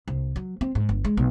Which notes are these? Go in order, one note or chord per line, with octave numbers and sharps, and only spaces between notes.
C2
F#3
C4
G#2
G1
G#3
B1